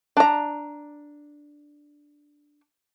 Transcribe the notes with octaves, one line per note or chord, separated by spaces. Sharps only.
D4 A#5